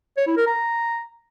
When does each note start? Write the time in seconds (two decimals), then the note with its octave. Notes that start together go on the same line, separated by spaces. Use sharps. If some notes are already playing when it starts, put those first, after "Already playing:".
0.17 C#5
0.27 E4
0.37 A#4
0.46 A#5